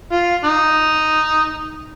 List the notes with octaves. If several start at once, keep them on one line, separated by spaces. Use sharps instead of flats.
F4
D#4